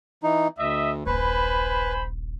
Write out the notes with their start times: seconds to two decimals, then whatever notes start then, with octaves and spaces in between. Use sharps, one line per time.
0.23 E3 D#4
0.59 D2 D#5 E5
1.06 D#1 A#1 B4 C5 G#5 B5